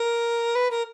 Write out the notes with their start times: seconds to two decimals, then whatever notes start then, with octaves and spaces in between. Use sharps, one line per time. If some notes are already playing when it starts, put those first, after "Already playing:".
Already playing: A#4
0.55 B4
0.71 A#4